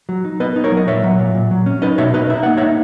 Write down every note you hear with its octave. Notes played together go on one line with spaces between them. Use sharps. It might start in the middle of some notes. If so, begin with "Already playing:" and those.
F#3
D#4
B3 B4 D#5
D#4
A#4 C#5
F#3
D#5
A#2 C#5 E5
F#3
A#2
A#2
F#3
C#4
D#4 B4 D#5
B2 C#5 E5
D#4 B4 D#5
D#4 E5
A#3 F#5
C#5 E5
D#4